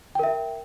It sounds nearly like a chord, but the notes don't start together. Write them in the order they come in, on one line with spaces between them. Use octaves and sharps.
G5 A#4 E5